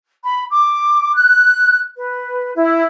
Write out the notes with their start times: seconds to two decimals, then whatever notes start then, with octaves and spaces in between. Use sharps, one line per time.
0.24 B5
0.49 D6
1.15 F#6
1.95 B4
2.54 E4